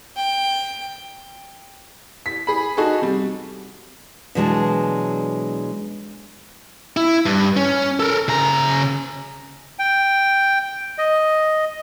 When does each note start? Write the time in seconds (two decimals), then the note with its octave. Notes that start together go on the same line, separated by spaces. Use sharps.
0.16 G5
2.26 B6
2.47 G#4 B5
2.77 D#4 F#4 G#4 A4
3.02 C3 G3
4.35 B2 E3 F#3 G#3 D4 A5
6.97 E4
7.26 G2
7.57 C#4
8.00 A4 A#4
8.28 C#3 A#5
9.79 G5
10.98 D#5